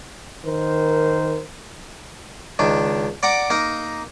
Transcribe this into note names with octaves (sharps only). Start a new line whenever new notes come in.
D#3 A#4 C5
C#2 D#3 D4
D5 F#5 A#5 D6
A#3 D#4 A#4